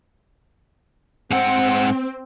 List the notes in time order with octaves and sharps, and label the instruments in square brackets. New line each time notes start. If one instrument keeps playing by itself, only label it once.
[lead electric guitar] G#2 F#5 [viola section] C4